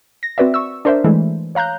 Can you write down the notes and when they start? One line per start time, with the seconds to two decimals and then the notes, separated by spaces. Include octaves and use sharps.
0.23 A#6
0.38 C4 F#4 B4 D5 E5
0.54 C#6 E6
0.85 D4 A#4 C5 D5 E5
1.04 E3 G#3 A3
1.55 C#5 F5 A#5 F#6 G6